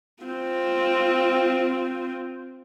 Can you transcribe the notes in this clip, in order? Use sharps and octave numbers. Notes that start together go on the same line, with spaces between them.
C4 F4